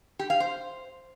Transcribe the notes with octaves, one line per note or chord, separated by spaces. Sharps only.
G4
F5
C5